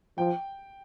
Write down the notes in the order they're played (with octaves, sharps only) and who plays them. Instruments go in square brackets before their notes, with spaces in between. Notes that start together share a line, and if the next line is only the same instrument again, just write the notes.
[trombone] F3 [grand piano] G5